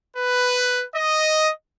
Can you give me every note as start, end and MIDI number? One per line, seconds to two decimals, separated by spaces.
0.17 0.84 71
0.94 1.51 75